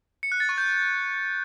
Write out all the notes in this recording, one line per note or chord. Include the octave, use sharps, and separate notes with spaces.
C#7
F#6
A6
C#6
G6